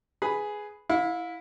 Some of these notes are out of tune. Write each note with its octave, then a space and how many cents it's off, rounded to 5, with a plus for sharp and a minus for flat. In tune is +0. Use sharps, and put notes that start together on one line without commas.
G#4 +5 B4 +0 B5 +5
E4 +0 F5 +35